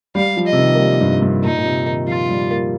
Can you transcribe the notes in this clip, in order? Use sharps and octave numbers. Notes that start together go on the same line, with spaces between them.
G3 F5
F3
D#5
C3
D#3
A#3
G3
G2
G2
A#2 D#4
A#2
C3
D#3
F3 F4
G3
A#3